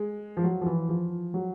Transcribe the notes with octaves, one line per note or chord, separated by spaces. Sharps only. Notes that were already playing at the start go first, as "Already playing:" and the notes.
Already playing: G#3
F3
F#3
F3
E3
F3
F#3